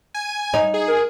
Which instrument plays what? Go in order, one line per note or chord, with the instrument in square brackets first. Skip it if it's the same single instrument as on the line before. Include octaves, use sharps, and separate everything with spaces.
[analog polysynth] G#5
[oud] D#4
[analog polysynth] G#4
[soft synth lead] A#4